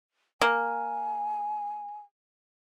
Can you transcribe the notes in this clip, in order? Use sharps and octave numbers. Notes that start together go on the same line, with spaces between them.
A#3 G#5